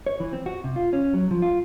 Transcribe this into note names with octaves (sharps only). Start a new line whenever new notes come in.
C#5
E3
C4
F#4
C3
F4
C#4
F#3
F3
F4